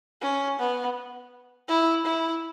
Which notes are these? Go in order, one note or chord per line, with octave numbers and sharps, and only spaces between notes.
C#4
B3
E4
E4